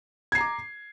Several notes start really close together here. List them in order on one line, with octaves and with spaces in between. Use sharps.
G#6 C7 A#5 D6